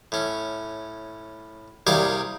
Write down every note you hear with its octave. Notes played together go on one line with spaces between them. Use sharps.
A2 C#4
C2 G3 A#3 G#4 C#5 D6